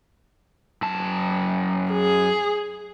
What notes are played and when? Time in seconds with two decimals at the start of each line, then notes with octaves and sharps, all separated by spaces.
0.82 F#2 A5
1.91 G#4